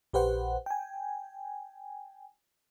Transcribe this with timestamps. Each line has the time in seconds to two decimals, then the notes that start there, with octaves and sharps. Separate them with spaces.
0.13 A#1 G4 B4 C5 F#5
0.66 G5 G#5